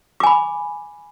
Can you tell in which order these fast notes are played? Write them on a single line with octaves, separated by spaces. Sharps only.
D6 G#5 B5